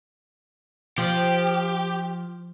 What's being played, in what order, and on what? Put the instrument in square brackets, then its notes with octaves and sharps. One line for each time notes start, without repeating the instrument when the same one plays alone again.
[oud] F3 [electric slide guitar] G4